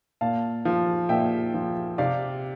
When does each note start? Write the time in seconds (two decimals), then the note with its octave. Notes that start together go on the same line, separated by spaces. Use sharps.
0.21 A#2 F5 A5
0.65 F3
1.09 A#2 E5 G5
1.54 F3
1.98 C3 D5 F5